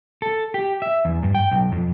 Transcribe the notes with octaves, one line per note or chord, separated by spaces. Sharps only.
A4
G4
E5
E2
G2
G5
B1
F2